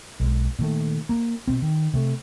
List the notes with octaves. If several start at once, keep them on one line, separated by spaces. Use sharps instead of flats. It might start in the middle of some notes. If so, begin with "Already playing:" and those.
B1 G#3
A#2 D#3 A3
A#3
B2 C4
D#3
C3 A3